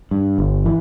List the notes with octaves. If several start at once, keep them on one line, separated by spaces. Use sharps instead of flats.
G2
G1
E3